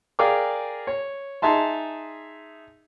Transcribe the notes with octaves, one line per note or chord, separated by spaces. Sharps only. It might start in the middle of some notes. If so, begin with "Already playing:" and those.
G#4 A#4 D5 F5 G5 D6
C#5
D#4 G#4 E5 A5 C6